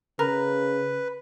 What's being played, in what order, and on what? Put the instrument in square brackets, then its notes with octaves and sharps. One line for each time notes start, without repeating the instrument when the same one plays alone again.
[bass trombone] C#3 [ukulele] A#4 [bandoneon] B4